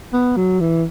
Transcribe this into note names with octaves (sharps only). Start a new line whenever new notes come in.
B3
F#3
E3